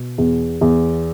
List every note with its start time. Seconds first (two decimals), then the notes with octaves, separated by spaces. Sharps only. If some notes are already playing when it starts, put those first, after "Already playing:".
Already playing: B2
0.18 E2
0.61 E2